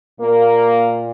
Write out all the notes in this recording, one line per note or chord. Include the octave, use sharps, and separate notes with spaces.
A#2 A#3